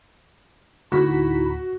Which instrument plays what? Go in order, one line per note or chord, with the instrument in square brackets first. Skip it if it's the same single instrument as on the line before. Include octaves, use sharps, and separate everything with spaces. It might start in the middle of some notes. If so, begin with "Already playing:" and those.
[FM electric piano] D2 A2 B6 [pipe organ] D#4 E4 [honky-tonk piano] F#4